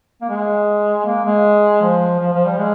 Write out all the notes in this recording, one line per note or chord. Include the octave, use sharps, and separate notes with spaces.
A#3
G#3
A#3
G#3
F3
F3
F3
G3
G#3